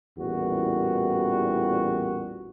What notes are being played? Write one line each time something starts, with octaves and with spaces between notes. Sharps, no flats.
A1 E2 A#2 G3 F#4